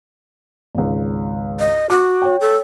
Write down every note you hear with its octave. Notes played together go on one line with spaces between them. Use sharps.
G#1 C#2
D#5
F#4 D6
C#5 G5
A4